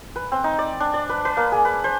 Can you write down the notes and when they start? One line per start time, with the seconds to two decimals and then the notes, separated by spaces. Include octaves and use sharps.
0.16 B4
0.32 C4
0.44 D#4
0.59 D5
0.80 D4
0.94 D5
1.09 B4
1.25 B4
1.37 A#3
1.52 G#4
1.65 B4
1.84 C5